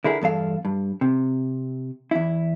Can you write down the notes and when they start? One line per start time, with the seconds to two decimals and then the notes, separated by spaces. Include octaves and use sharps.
0.04 D3 E4 G#4 A#4
0.21 E2 G2 A4 F5
0.65 G2
1.01 C3
2.11 E2 E4